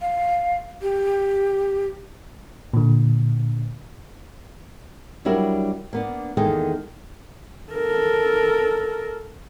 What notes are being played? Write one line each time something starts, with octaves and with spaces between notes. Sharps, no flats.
F5
G4
A#2 D3
F#3 G3 D4 E4 F#4 A#4
A#3 B3 D4
E2 D#3 G#3 A#3 A4 G5
A4 A#4